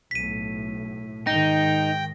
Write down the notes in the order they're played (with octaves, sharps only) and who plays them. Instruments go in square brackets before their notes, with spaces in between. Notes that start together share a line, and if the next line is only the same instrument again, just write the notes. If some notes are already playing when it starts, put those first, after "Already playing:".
[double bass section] B1 A2 [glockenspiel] B6 D#7
[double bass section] G#2 D#3 [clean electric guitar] D#4 [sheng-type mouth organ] G5 [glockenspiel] A#6